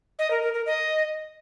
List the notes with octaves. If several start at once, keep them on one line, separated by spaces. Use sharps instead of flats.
D#5
A#4
A#4
A#4
D#5